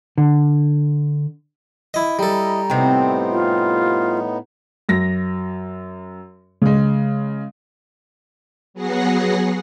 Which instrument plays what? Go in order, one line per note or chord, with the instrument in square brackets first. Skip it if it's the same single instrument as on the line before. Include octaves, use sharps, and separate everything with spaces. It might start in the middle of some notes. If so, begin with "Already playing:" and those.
[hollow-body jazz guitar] D3
[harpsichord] E4 D#5
[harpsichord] G3 A4 [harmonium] E4 D#5 [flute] A#5
[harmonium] A2 B3 D#4 [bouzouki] C3 C4
[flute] F4
[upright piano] F#2 A#6
C#3 G#3
[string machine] F#3 B3 G#4 F#5 A#6 C7